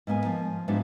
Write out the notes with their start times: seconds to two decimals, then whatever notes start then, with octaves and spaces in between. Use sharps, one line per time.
0.07 G#2 A#3 B3 G#5
0.25 F3
0.68 G#2 F3 F#3 B3 D4 E4